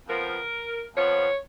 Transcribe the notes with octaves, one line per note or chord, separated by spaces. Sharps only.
F2 F3 B3 A#4
F2 F3 B3 C#5